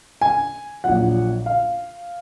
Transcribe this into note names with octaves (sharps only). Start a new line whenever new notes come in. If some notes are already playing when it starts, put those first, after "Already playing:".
G#5
A#1 A#2 F#3 F#5
F5